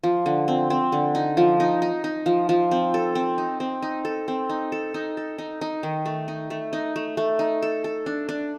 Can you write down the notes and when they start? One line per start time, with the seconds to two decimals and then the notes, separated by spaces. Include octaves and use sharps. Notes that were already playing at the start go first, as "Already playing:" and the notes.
0.03 F3
0.26 D3
0.48 C4
0.70 C4
0.92 D3
1.15 D#4
1.37 F3
1.60 D#4
1.82 D#4
2.04 D#4
2.26 F3
2.49 F3
2.71 C4
2.94 A4
3.15 C4
3.38 D#4
3.60 C4
3.82 D#4
4.05 A4
4.28 C4
4.49 D#4
4.72 A4
4.94 D#4
5.17 A4
5.38 D#4
5.61 D#4
5.83 D#3
6.06 A3
6.28 D#4
6.50 A3
6.73 D#4
6.96 A3
7.17 A3
7.39 D#4
7.62 A4
7.84 A4
8.06 D4
8.29 D4